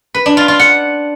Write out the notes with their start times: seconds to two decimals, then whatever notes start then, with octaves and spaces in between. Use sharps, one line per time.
0.15 B4
0.26 D4
0.37 F4
0.48 F4
0.59 F#5